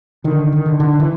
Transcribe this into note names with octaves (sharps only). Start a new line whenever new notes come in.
D3 D#3
D#3
D3
D3
E3